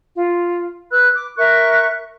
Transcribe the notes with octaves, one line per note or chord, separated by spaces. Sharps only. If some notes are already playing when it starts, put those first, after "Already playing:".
F4
B4 B5 E6 F#6
D6
A#4 E5 C#6 F#6